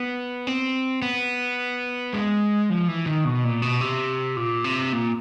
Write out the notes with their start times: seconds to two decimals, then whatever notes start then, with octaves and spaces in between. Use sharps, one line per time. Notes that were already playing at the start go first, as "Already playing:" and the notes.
Already playing: B3
0.47 C4
1.02 B3
2.14 G#3
2.70 F3
2.88 E3
3.06 D#3
3.25 B2
3.44 A#2
3.62 B2
3.81 C3
4.37 A#2
4.64 C3
4.93 A#2